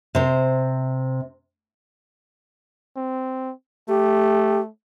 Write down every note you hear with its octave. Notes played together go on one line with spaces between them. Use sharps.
C3 C5
C4
A3 G4